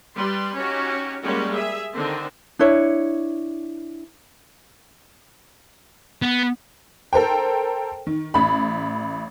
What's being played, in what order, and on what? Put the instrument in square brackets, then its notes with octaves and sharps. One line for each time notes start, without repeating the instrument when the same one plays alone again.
[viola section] G3 B4 C6
C#4 D#4 F#4 G4
G3 G#3 A#3 C#4 F#4
G#4 E5
D3 D#3 C4
[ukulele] D4 E4 C#5
[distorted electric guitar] B3
[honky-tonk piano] A4 A#4 C5 G5
D#3
A1 B5